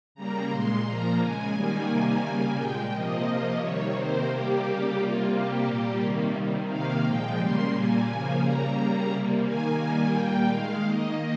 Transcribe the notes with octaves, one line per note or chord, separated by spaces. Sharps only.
C#3 G3 A#3 A#5
A#2 G#3 C6
A#2 F3 A#3 A#5
C#3 G#3 G#5
D#3 G3 A#3
C3 D#3 G3 A#3 G#5
C#3 G3 A#3
A#2 G#3 G5
C3 F3 A#3 D#5
C3 F3 A#3 D#5
C3 D#3 G3 C#5
C3 D#3 A#3 C5
C3 G3 A#3 G4
C#3 G3 A#3
C3 G3 A#3 F4
C3 G3 A#3 G4
A#2 G3 A#3
C3 D#3 G3 A#3
C3 D#3 G3
C3 D#3 A#3 F5
A#2 F3 G#3 G5
C#3 G3 A#3 C6
A#2 G3 A#3 G#5
C#3 F3 A#3 G#5
C#3 G3 A#3 A#5
C#3 G3 A#3
C3 G3 A#3
D#3 A#3 G#5
D#3 G3 A#3
A#2 G3 A#3 G5
D#3 G#3 F5
D#3 A#3 D#5